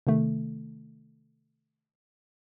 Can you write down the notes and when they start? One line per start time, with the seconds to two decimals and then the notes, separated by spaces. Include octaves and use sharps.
0.07 C3 D#3 A3